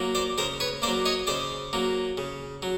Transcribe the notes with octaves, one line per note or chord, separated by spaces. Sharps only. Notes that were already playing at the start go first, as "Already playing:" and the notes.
Already playing: F#3 A#3
C5 D5
C#3 A#4 C5
B4 C#5
A#3 C5 D5
F#3
C#5 D#5
C#3 C5 D5
F#3 A#3
C#3
F#3